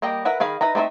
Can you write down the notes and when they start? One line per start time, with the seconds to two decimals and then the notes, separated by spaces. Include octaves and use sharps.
0.02 G3 A#3 D#5 G5
0.25 A#4 B4 E5 F#5
0.40 D#3 G#4 F5 B5
0.61 D#4 B4 E5 A#5
0.75 A3 C4 D#4 B4 E5